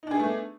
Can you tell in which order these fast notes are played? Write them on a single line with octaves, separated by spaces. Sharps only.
D#4 D4 G#4 B3 A3